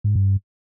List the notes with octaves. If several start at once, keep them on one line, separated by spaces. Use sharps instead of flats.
G#2
G2